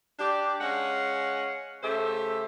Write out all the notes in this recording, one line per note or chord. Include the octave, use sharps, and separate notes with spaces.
D4 G4
G#3 C#4 F5 F#5
C#3 A3 G4 C5 E5